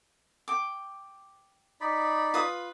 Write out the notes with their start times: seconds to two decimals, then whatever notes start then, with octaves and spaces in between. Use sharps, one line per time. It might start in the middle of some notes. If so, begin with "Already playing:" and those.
0.48 G5 D6
1.81 D#4 D5 B5
2.34 F4 B4 D#6